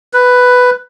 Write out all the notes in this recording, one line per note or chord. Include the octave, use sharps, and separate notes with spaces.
B4